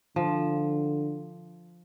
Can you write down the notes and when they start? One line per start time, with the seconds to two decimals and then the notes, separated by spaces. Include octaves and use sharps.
0.16 D3 F3